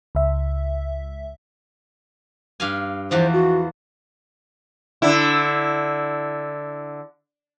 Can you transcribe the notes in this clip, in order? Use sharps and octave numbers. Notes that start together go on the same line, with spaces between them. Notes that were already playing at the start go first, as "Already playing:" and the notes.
C#2 E5
G2 F5 G#5
E2 E3 F3 C5
F#4
D3 E4